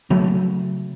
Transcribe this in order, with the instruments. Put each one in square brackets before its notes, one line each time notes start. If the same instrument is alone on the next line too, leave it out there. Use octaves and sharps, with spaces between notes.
[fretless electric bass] C#3 F#3 A3